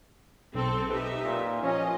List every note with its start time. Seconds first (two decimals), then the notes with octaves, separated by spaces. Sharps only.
0.55 B1 C4 A4 E6
0.91 D#4 G4 B4 E5
1.25 A#2
1.63 F3 C#4 F4 D#5